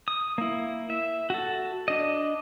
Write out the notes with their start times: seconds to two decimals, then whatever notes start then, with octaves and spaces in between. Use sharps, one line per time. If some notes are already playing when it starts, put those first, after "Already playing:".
0.08 D#6
0.38 A#3 E4
0.90 E5
1.30 F#4 A4
1.88 D4 D#5